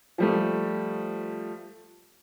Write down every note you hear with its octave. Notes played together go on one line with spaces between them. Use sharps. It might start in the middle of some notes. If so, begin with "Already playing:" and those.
F3 G3 A3